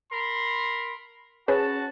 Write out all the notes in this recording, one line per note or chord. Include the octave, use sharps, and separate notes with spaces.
A#4 B5 C6
C#4 F#4 G#4 B4 A5